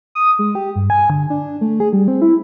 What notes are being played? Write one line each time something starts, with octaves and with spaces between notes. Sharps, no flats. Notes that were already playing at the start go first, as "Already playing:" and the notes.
D#6
G#3
G4
G2
G#5
D3
D4
A3
G#4
G3
C4
E4